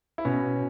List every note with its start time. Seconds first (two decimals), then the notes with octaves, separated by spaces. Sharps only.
0.18 E4
0.25 B2 C#4